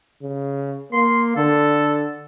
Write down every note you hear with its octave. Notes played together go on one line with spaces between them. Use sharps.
C#3
A#3 C6
D3 A4